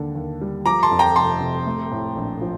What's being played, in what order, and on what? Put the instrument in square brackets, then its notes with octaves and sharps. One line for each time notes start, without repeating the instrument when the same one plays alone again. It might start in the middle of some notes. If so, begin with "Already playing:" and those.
Already playing: [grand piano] D#2 D3
D#2
G3
[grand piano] F3 [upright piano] A#5 D6
[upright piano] A5 C6
[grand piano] F2
[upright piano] G5 A#5
[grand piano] F1 [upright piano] A5 C6
[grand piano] C3
A3
A2
A#1
F3